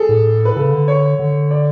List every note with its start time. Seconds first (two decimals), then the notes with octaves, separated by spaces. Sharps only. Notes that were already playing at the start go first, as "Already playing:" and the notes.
Already playing: G#4 A4
0.09 A2
0.45 B4
0.56 C#3 A4
0.72 D3
0.88 C#5
1.19 D3
1.51 D5